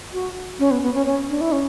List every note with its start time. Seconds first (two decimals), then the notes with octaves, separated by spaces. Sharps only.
0.13 F#4
0.59 C#4
0.71 B3
0.82 B3
0.94 C#4
1.06 C#4
1.29 D4
1.41 E4
1.52 C#4